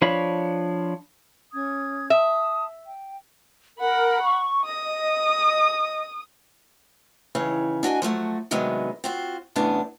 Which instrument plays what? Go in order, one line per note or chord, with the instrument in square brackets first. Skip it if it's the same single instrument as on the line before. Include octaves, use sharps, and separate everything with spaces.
[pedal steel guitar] F3 D4 C#5 F5 B5
[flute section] C#4 D#6 G#6
[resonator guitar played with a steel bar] E5 [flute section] A5 D#6
[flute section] G5
[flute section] A#4 [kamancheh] F#5 B5
[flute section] C#6
[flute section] D#5 [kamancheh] D#6
[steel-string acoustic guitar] D#2 C#3 E3 C#5
D4 F#4 D#5 G#5
F3 F#3 A3 F#4
C3 D#3 F#3 G#3 B3 D4
C4 F4 F#4
F#2 A2 C#3 E3 B3 D4